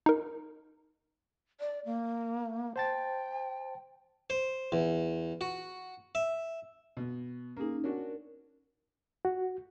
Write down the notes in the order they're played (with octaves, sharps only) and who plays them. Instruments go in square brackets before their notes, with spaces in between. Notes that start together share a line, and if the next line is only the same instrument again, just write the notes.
[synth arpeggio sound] D#4 A#4
[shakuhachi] D5
A#3
[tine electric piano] C5 A5 A6 [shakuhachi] G5
[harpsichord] C5
E2
F#4
E5
[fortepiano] B2
[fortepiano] A#3 G#4 [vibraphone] C#4 D#4
[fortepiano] C#4 D4 F#4 [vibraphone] A#4
[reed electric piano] F#4